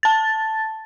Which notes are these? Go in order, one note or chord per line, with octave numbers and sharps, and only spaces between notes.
A5 A6